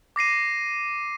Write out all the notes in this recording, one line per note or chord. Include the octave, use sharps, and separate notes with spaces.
D6 A#6 C7 D#7